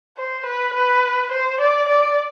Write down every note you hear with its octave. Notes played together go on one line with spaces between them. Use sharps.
C5
B4
B4
C5
D5
D5